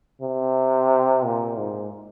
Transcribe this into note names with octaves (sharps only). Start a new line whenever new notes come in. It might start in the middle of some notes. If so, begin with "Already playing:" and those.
C3
A#2
G#2